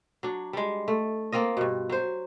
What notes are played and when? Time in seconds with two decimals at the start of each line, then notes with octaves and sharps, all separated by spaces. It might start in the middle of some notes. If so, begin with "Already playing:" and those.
0.23 F#3 D4
0.53 G3 G#3
0.88 A3
1.32 A#3 C4 F4 D#5
1.57 G2 B2
1.89 F#3 C5